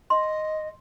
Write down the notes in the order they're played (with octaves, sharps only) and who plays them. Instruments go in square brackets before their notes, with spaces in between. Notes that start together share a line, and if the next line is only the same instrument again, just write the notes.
[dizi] D#5 [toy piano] C6